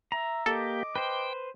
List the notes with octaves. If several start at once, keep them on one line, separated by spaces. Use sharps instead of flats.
E5 A#5
A#3 G4 A4 D#5 D6
B4 C5 G5